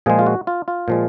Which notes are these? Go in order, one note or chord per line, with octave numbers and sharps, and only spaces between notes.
A#2 F3 G#3 G#4
F4
F#4
F4
F4
A#2 F3 G#3